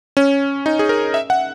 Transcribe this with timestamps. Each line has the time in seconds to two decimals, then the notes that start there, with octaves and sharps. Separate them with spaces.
0.17 C#4
0.66 D#4
0.79 G#4
0.89 A#4
1.14 E5
1.30 F#5